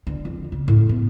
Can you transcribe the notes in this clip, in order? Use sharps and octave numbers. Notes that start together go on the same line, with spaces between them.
D3
F2
C#3
A2
B3